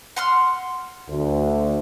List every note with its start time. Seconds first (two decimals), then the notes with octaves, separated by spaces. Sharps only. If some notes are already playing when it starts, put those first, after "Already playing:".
0.16 F#5 C6 F6
1.09 D2